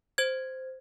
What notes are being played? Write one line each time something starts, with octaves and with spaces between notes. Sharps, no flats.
C5 G#6